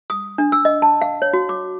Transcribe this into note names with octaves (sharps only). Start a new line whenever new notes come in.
D#6
D4
E6
D#5
A5
F5
C#5
F#4
D6